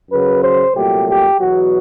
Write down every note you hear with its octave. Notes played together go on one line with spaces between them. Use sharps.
F#2 C#3 F#3 B4
C5
C2 A#2 F#3 A3 G4
G4
E2 B2 F#3 B3 F#4